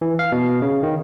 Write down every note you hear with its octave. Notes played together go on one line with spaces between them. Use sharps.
E3
F5
B2
C#3
D#3